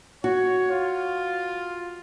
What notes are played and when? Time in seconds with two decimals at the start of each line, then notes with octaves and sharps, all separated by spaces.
0.24 F#4 C#5
0.71 F4